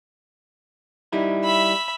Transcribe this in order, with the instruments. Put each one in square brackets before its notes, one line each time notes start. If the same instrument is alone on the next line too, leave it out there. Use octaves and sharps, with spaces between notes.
[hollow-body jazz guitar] G3 D#4 E4
[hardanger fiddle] E5 B5